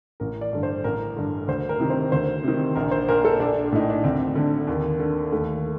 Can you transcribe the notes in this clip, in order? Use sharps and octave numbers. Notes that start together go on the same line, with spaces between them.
A1 A#4
D5
G2 D3
C5
A1 A#4
G2 D3
D2 C5
A#4
C3 D#3
C5
D2 C5
C3 D#3
A#1 A#4
C5
A#2 A#4
A4
A#1 D4
A2 D#4
D4
D2 C4
D3
D#2
D3
D#2 A3